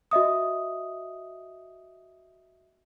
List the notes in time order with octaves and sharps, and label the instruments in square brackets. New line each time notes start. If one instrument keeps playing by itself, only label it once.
[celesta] F#4 D#5 E5 D#6